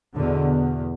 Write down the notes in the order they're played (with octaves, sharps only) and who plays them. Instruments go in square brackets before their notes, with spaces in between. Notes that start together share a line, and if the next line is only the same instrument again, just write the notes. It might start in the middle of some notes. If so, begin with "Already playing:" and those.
[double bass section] E2 B2 D3